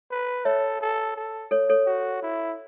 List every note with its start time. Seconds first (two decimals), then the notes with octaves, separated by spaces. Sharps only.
0.11 B4
0.45 A4 C#5 E5
0.81 A4
1.17 A4
1.51 A4 C#5
1.70 A4 C#5
1.86 F#4
2.23 E4